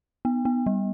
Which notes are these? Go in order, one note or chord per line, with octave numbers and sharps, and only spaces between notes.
B3
B3
G3